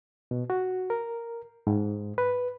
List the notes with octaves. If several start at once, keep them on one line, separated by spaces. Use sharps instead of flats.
B2
F#4
A#4
G#2
B4